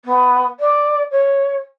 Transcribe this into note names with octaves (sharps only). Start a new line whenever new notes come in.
B3
D5
C#5